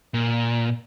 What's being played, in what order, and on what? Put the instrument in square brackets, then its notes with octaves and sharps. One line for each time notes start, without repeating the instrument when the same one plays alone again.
[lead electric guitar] A#2